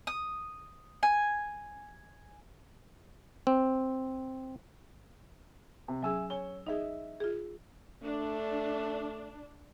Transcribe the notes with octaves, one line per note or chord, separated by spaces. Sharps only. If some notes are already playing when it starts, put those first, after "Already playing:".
D#6
G#5
C4
C3
F#3 C#4 G#4 E5 G#5 E6
C#5 G#5 G7
D#4 G#4 D#5 E5
F4 G#4
A3 D4